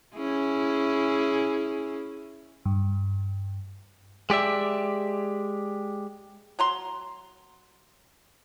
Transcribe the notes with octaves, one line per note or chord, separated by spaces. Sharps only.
C#4 E4 G#4
G2
G#3 G4 D5 E5
F#3 A#5 C6